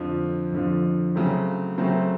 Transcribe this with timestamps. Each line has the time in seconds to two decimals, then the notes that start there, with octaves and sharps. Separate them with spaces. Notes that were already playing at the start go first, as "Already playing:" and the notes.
Already playing: F2 D3 F3
0.52 F2 D3 F3
1.15 C#3 F#3 A3 C4
1.78 C#3 F#3 A3 C4